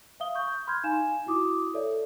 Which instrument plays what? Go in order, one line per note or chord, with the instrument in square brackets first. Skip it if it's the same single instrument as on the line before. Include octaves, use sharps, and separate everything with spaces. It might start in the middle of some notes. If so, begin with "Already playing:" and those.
[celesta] E5 F5 D#6 G7
C#6 G6
B5 C6 F6 G6 G#6
D#4 F5 G#5 E7
E4 F#4 D6 D#6
A4 C#5 D5 E5